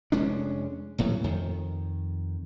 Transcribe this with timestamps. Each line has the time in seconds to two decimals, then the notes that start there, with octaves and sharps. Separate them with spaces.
0.12 F1 G#3 C#4 D4
0.98 D#1 A2 F#3
1.24 F2 D#3